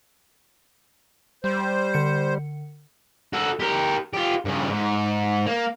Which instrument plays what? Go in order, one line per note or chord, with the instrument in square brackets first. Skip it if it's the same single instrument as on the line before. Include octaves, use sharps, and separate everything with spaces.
[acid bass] G3 [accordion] C5
[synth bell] D3 C#7
[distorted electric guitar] F#4 A4
G4 A#4
F4 G4
G2 C#3
G#2
A#3